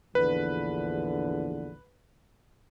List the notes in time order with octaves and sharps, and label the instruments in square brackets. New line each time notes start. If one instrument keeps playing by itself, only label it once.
[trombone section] A#1 E2 D3 [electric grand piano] B4